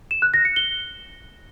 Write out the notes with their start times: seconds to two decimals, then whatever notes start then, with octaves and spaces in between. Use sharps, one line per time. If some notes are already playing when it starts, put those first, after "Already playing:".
0.11 E7
0.22 F#6
0.34 A#6
0.45 C#7
0.56 G7